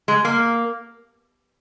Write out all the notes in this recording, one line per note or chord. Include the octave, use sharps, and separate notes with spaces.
G#3
A#3